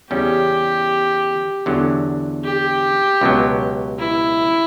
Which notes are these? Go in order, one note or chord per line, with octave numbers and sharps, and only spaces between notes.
E2 C#3 G3 C#4 G4
E2 D3 F#3
G4
C#2 B2 F#3
E4